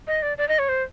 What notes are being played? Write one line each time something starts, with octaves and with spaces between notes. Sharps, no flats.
D#5
D5
D5
D#5
C#5
C5